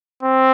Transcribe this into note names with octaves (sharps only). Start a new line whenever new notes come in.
C4